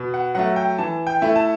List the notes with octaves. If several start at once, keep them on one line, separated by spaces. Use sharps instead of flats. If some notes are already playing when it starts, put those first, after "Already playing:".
Already playing: B2
F#5
F#3 A3 F#5
G5
E3 A5
G5
A3 E4
A5